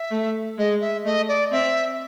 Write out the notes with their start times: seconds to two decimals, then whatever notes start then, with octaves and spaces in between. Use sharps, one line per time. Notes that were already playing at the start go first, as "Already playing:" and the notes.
Already playing: E5
0.11 A3
0.58 G#3 D#5
0.81 E5
1.05 A3 D#5
1.28 D5
1.51 C4 E5